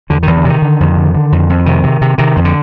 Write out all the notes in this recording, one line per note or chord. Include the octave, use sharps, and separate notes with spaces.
E2 D3
E2 D#3
D3
C3 D#3
D3
F2
D3
D3
F2
F2
C3 D#3
C3
C3
C3 D#3
F2
D3